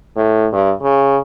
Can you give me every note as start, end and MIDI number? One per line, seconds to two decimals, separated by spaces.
0.16 0.47 45
0.53 0.72 43
0.82 1.17 49